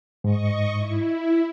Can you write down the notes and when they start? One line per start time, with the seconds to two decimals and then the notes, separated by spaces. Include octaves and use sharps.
0.24 G#2 D#5 C#6
0.78 E4